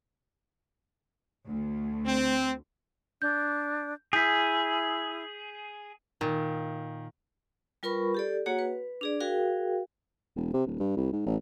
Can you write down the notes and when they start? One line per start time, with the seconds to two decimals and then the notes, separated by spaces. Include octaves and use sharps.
1.47 D2
2.06 C4
3.22 D4 G6
4.13 E4 G#4 G6 B6
6.21 A#2 D#3
7.83 G3 F4 A#4 B4 B5 C#6
8.14 G4 A4 D5
8.46 A#3 F#4 G#4 C#5 F#5
8.59 B4
9.01 D4 G#4 D5
9.21 F#4 G#4 A#4 F5 G5
10.36 E1
10.54 C3
10.66 D#1
10.80 G2
10.97 C2
11.13 G#2
11.26 A1